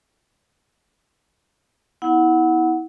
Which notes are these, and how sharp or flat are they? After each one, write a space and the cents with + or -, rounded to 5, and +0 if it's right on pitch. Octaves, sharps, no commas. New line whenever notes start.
B3 +0 E4 -30 F#5 +0